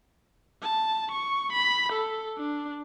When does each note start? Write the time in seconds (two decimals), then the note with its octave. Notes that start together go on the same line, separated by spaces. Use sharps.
0.63 A5
1.12 C#6
1.53 B5
1.93 A4
2.38 D4